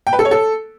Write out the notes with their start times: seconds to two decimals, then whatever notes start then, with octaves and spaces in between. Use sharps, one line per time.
0.07 G5
0.13 B4
0.19 A4
0.25 C#5
0.31 A4